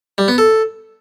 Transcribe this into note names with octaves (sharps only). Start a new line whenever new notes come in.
G3
B3
A4